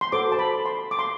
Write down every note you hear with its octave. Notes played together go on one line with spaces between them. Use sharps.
C6
F#4 A4 C5 D6
A5
B5
C6
D6
C6